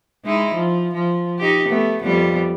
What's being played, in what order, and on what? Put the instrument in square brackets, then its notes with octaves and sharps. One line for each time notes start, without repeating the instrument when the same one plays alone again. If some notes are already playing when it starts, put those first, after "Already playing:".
[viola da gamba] G#3 D#4 E4
F3
F3
D#4 G4
A3 B3
F2 G3 B3